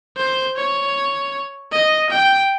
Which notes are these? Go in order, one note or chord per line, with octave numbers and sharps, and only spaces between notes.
C5
C#5
D#5
G5